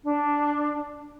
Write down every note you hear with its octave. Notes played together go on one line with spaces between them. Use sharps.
D4